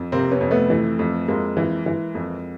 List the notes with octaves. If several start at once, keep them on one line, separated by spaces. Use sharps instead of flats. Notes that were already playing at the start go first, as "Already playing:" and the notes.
Already playing: F2
C3 A#3 C4
B3 C#4
F2
A3 B3
E3 A3
F2
F2 G#3 A#3
E3
E3
F2